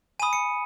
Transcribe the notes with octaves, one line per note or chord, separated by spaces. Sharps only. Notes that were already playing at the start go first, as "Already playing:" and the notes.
G#5 B5 D#6 D#7
C#7